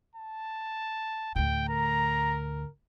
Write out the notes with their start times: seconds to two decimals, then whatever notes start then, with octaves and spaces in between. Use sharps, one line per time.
0.16 A5
1.36 D2 A2 G5
1.69 A#4 A#5